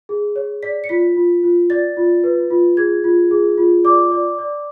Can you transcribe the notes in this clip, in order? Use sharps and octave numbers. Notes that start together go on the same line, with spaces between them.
G#4
C#5
D5 B6
C#7
F4 B6
F4
F4
D5 A6
F4
B4
F4
G#4 G#6
F4
G#4
F4
D5 D6
D5
D5